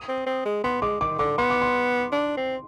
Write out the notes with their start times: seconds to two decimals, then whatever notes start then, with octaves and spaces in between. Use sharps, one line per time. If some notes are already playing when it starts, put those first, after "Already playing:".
Already playing: D#6
0.08 C4
0.26 C4
0.45 G#3
0.64 B3 C6
0.82 G#3 D6
1.00 D#3 D6
1.19 D3 D6
1.38 B3 C6
1.50 D6
1.62 C6
2.12 D4
2.37 C4